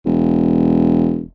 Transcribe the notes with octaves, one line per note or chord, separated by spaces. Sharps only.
E1